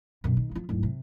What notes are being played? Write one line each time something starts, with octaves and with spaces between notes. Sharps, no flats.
F#2 B2
D#3
F3 F4
D1 G#2
C3